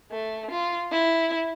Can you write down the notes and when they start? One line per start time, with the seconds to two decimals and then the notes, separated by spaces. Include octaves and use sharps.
0.12 A3
0.52 F4
0.93 E4